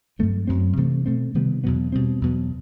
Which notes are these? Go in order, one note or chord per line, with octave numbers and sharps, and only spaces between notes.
G2 F#3 A3 C4
F#2 F#3 C4
C3 E3 A3 C4
B2 A3 C4
C3 D#3 G3 B3
E2 B2 F#3 B3
B2 G3 C4
E2 B2 F#3 B3